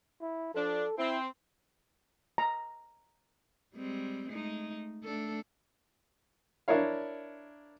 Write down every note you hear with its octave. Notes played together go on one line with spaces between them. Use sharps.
E4
F3 D4 A4
C4 E4
A#5
G3 G#3 C4
G#3 A3 D#4
A3 D4 A4
D4 E4 A#4 C#5 F5